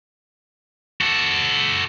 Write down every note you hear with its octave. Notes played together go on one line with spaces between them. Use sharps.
F#4 A4